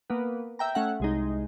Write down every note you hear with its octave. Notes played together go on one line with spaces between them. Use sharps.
A#3 B3
E5 G5 A#5
A3 C#4 E5 F#5
C2 G#3 D#4